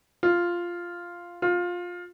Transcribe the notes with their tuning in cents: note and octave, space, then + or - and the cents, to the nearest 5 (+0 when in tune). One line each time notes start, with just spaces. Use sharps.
F4 -5
F4 +15